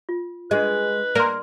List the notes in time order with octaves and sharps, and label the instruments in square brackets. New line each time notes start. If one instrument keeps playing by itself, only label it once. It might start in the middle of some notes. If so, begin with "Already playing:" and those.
[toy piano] F4
[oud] G#3 [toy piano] D4 G#4 D#5 [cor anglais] B4
[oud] A#3 [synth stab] A#4 [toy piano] D5 C6